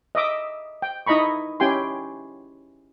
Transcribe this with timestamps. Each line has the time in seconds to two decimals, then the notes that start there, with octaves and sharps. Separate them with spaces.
0.15 D#5 E5 D6
0.82 G5
1.07 D#4 E4 D#5 A#5 B5 C#6
1.60 C#4 E4 G4 G5 G#5 C6